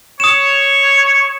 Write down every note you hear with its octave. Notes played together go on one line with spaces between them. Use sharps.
C#5 D#6 E7